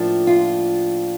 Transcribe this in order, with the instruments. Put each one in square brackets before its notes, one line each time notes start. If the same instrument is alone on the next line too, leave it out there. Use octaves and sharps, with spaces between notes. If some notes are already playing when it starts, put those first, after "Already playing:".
Already playing: [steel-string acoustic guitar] A2 F3 A#3 D4
F4